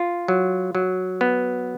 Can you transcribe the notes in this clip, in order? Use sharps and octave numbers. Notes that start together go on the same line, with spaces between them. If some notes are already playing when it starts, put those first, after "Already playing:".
Already playing: F4
F#3
F#3
B3